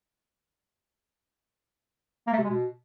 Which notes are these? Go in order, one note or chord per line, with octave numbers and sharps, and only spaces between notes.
A#3
A3
C3
G#3
B2